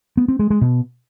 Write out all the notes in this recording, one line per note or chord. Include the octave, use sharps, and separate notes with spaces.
B3
C4
G#3
G#3
B2